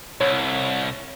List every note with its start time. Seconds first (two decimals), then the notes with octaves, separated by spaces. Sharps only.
0.21 C2 C#5